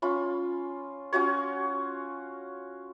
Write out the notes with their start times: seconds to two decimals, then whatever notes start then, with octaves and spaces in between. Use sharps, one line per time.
0.02 C#4 F4 B5
1.13 C#4 F4 F#4 C#5